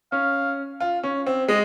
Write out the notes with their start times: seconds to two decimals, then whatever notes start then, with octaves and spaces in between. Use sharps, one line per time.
0.12 C#4 F5
0.80 F4
1.03 C#4
1.27 C4
1.48 G#3 D#5